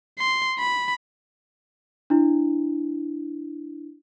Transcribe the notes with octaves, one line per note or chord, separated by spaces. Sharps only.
C6
B5
D4 E4